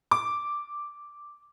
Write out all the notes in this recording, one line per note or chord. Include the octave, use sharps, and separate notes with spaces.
D6